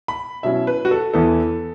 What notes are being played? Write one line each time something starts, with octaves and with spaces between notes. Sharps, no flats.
B5
B2 F#3 C#4 E4 E5
B4
F#4
A4
E2 E3 B3 E4 A4